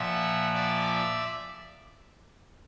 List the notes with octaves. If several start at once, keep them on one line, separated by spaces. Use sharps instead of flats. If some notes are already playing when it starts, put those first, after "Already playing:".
Already playing: A#2 F3 E5 F#5
D5 E5